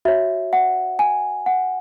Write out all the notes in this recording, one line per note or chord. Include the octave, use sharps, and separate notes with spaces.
F#4 C#5 E5
F#5
G#5
F#5